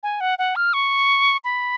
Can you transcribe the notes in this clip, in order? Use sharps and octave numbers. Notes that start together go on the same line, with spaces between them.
G#5
F#5
F#5
F6
C#6
B5